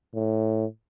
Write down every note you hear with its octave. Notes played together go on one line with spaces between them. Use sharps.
A2